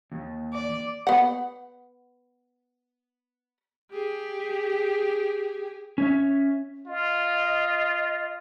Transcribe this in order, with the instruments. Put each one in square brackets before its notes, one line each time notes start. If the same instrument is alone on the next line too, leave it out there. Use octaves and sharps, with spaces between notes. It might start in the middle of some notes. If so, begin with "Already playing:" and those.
[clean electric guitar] D#2
[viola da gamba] D5
[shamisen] B3 F#5
[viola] G4 G#4
[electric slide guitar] C#4 C#5 E5
[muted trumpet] F4 [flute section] D#5